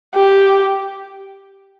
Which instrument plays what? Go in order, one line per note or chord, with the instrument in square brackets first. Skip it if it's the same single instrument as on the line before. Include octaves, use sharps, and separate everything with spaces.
[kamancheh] G4